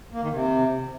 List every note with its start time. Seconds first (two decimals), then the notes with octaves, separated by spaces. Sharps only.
0.12 A#3
0.22 D#3
0.32 C3